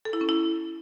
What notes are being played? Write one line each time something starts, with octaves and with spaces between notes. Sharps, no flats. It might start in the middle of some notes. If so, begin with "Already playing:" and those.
A4
E4
C#4
E4